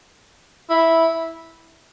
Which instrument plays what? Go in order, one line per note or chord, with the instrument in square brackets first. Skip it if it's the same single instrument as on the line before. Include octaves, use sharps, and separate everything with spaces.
[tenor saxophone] E4